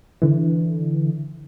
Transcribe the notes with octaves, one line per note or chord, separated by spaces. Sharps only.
D3 E3